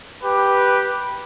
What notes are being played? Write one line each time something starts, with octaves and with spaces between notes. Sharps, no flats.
G4 B4